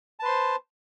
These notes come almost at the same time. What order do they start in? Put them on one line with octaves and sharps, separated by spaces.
A5 B4 C6 C5